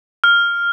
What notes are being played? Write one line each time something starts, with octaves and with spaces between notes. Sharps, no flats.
F6